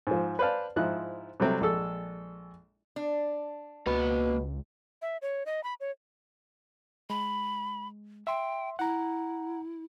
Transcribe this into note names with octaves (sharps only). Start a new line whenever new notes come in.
G#2 F3
B4 C5 D5 F5 A5
G#2 F3 D#4 E4 F#6
C3 F#3 G3 A3 C4
A#1 G#3 A4 E6
D4
C#2 B2 A#3 B5
E5
C#5
D#5
B5
C#5
G#3 B5
E5 G5 C6
E4 F#5 A#5